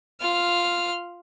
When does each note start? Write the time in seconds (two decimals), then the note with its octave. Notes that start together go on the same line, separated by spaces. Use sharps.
0.21 F4 F6